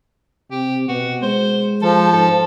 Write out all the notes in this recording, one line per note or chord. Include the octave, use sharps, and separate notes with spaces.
C3 G4
B2 F#4
G#3 C5
F3 A4
G#2 A4